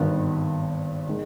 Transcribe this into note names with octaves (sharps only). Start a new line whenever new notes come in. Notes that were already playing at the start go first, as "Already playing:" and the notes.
Already playing: G#1 G2 D#3 B3
D#3 G#3